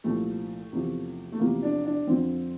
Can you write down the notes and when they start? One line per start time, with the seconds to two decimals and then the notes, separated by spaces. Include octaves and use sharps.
0.04 C2 A#2 F3 A3
0.72 E2 C3 F3
1.32 A3
1.39 E2 C3 F3 A#3
1.62 D4
1.85 D4
2.07 F2 D3 F3 C4